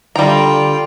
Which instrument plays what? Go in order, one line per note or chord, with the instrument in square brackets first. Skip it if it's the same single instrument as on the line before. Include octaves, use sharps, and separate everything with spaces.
[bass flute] D3 [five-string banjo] G3 A#5 [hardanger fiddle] F4 G5